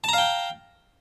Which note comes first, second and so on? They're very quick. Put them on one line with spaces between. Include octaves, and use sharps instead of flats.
A5 A#5 F5 G5